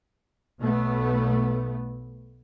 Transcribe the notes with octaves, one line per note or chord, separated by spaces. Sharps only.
B1 A3 B3